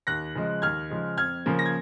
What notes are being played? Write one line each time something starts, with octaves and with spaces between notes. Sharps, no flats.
D#2 F#6 A#6
C#3 F3 G#3
D#2 F6 G#6
C#3 F3 G#3
F2 F6 G#6
C#3 F3 A#3
A#6
G#6